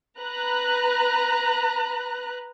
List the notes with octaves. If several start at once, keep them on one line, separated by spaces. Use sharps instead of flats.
B4 A#5 F#6